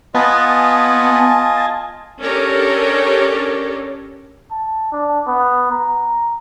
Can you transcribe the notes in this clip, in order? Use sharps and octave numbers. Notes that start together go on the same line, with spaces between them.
B3 F4 D#5 G#5 A5
C#4 D4 G4 A4 A#4 C#5
A5
D4
B3
A#5